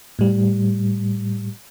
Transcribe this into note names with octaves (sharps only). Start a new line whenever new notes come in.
A2 G3